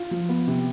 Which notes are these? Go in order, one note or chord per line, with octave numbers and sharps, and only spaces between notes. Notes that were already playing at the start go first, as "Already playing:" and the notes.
Already playing: F4
F3
B3
C3